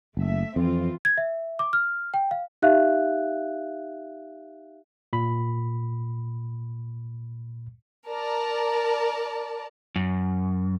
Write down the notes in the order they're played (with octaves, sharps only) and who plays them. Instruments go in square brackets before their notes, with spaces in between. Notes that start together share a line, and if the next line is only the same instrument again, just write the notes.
[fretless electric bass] F#1 [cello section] A3 E5
[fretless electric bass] F2 [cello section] E3 C4 F4
[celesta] G#6
E5
D6
F6
G5
F5
D#4 G4 E5 F5 F#6
[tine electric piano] A#2 B5
[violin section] A#4 D5 A5
[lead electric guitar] F#2